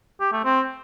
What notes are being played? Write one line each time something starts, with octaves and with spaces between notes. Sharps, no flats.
G4
A3
C4